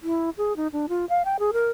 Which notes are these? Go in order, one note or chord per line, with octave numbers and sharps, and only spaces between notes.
E4
G#4
D#4
D4
F4
F5
G5
G#4
A#4